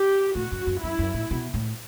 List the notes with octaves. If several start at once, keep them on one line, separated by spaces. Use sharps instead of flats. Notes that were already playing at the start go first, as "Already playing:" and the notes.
Already playing: G4
A2 F#4
F#2
F#2
F#2 E4
F#2
A2
B2
A2